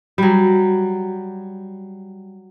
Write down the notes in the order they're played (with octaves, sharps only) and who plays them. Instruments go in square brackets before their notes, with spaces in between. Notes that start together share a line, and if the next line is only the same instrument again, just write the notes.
[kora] F#3 G3